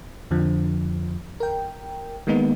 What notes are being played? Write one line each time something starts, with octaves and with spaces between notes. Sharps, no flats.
F2 D3 F3
A#4 G5
D#3 G#3 A#3 B3 D#4